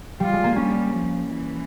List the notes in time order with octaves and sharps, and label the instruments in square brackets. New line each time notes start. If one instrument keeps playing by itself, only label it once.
[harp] G3 [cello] F4
[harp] G#3
A#3
[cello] G3 [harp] C#4
[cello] F3
E3